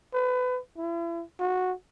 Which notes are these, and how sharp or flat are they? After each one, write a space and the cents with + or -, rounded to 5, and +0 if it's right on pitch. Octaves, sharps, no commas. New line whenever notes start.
B4 +30
E4 +40
F#4 -10